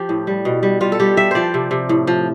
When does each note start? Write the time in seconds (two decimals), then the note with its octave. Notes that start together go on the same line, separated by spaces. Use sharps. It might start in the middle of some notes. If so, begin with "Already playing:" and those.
Already playing: F3 G4
0.09 A2
0.27 G3
0.45 B2
0.63 G3
0.81 G3 F4
0.92 A4
1.00 G3 G4
1.17 G3 E5
1.31 F3 C5 D5
1.54 C3
1.71 C3
1.89 A2
2.07 F3